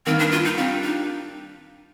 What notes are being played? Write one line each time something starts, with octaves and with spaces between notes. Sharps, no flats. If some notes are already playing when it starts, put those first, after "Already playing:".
G2 D#3 A#3 C4
D4
F4
D#4
G3 C4 D4 F4
D#4